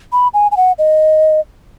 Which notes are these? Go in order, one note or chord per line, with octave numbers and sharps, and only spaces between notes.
B5
G#5
G#5
F#5
D#5